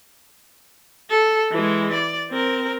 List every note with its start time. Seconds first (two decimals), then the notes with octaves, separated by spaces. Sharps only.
1.10 A4
1.51 E3 G#3
1.93 D5
2.30 C4 A#4